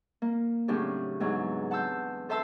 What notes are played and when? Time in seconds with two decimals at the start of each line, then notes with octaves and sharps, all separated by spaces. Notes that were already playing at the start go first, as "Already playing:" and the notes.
0.22 A#3
0.68 A2 C#3 F#3 C4 D4 G4
1.20 E2 G#2 F#3
1.71 F#5 A5 C6 E6 G6
2.29 A4 C5 E5 A5 C6 E6